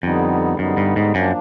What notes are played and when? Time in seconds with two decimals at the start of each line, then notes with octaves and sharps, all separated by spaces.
0.03 F2 D3 G3 B3 D#4
0.59 F#2 D3 G3 B3 D#4
0.77 G2
0.96 G#2
1.15 F#2 F3 A#3 D4